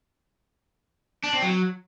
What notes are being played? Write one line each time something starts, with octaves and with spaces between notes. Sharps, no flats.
D4
C4
F#3